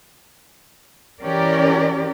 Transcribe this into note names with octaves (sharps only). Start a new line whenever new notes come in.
E3 C#4 G4 A#4 D5